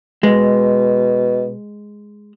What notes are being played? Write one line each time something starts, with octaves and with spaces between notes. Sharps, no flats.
B2 G#3